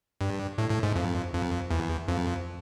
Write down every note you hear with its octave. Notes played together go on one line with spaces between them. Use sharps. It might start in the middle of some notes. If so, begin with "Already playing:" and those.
G2
A2
A2
G#2
F2
F2
E2
F2